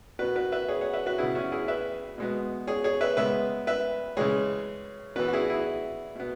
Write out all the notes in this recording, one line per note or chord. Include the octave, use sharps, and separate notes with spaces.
B2 B3 F#4 B4
F#4 B4
B4 E5
G#4 C#5
C#5 F#5
B4 E5
F#4 B4
C#3 F#3 B3 E4 G#4
C#4 F#4
E4 G#4
B4 E5
B2 G#3 B3
G#4 C#5
G#4 C#5
B4 E5
C#3 G#3 B3 B4 E5
B4 E5
C#3 E3 G#3 G#4 C#5
E3 B3 F#4 B4
F#4
E4 G#4
F#4
E4 G#4
B2 B3